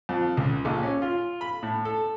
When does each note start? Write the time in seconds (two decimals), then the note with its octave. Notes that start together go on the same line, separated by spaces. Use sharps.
0.09 F2
0.37 C#2
0.65 A#1
0.83 C#4
1.02 F4
1.41 B5
1.63 A2
1.85 A4